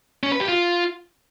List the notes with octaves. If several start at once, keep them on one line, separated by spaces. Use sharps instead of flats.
C#4
B4
G4
F4